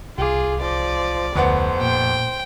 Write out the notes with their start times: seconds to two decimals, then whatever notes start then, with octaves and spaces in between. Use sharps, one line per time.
0.18 C2 F4 G#4 D6
0.61 F3 D5
1.36 F1 D2 B3 C5 F#5
1.81 A#2 G5